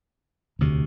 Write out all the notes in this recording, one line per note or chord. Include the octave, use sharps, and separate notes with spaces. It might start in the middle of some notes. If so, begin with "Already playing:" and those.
E1 D2 C3